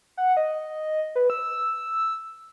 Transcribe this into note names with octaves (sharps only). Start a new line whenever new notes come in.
F#5
D#5
B4
E6